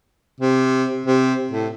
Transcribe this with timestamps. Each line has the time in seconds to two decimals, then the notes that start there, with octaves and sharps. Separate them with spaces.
0.41 C3
1.06 C3
1.52 A2